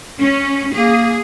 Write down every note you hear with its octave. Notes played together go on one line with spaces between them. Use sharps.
C#4
A#3 G#4